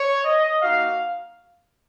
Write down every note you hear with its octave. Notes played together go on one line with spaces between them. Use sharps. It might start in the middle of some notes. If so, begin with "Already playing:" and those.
Already playing: C#5
D#5
A#3 D#4 F#4 F5